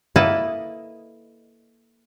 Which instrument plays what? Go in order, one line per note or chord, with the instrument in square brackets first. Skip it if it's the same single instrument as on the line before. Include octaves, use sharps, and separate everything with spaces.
[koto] A#3 E4 A4 B4 D#5